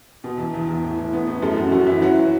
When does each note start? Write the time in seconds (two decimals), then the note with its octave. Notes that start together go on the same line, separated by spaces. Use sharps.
0.24 B2
0.38 E2
0.54 E2
0.68 E2
0.83 A2
0.98 A2
1.13 B3
1.27 A2
1.42 F#2 A4
1.57 F#2 F#4
1.72 F#2 F#4
1.87 E3 E4
2.02 F#3 F#4